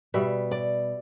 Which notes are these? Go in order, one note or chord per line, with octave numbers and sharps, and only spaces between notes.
B2 G3 E5
D5